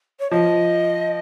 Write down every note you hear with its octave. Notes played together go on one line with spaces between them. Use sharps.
C#5
F3 D#5